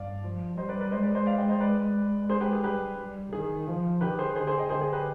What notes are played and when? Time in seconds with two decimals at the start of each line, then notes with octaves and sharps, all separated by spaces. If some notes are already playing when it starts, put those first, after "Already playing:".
Already playing: G2 D5 F5
0.23 F3
0.57 G3 C5 D#5
0.69 B4 D5
0.81 B4 D5
0.91 G#3 C5 D#5
1.03 B4 D5
1.15 C5 D#5
1.26 D5 F5
1.38 D#5 G5
1.49 C5 D#5
1.60 B4 D5
1.95 G#3
2.29 G#4 C5
2.41 G4 B4
2.53 G#4
2.64 G3 G4 B4
2.98 G3
3.33 D#3 G#4
3.67 F3
4.01 D#3 G4 B4
4.19 G#4 C5
4.35 D3 G#4 C5
4.47 G#4 C5
4.58 D#5 G5
4.69 D3 G#4 C5
4.81 G#4
4.93 G4 B4